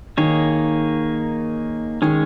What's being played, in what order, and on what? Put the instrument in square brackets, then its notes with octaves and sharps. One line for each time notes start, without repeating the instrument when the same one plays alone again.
[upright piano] D#3 [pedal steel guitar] A#3 D#4 G#4 C#5
[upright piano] D#3 [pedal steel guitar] G#3 C#4 G#4 C#5